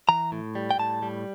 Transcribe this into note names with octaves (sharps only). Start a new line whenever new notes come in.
E3 A#5
A2
G3
G5
A2 A5
G3